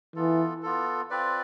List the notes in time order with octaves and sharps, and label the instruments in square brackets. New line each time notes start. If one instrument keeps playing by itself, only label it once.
[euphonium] E3 [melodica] B3 F4 A4
[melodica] B3 F4 A4
C4 F4 B4 D5